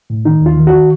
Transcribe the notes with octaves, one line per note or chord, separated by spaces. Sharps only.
A2
D#3 D#4
D#2
F4
D#3
F#4
D#3